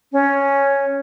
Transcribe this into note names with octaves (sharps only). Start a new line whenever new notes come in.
C#4